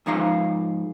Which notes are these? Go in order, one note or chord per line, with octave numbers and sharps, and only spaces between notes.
G#2 F3 D#4 F5 A#5